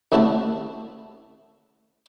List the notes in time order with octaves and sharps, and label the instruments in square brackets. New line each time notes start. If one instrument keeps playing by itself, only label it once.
[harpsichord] C2 C#3 A3 E4 F#4 A5